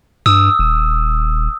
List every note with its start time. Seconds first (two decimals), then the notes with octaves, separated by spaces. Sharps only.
0.26 G2 D#6 E6
0.59 D#1